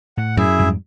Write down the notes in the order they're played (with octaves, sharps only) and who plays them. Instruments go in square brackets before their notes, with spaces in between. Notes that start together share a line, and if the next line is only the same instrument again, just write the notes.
[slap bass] A2 [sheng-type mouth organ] F#5
[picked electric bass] F#2 [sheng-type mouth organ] E4 G#4 E5
[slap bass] F2 G#2 G3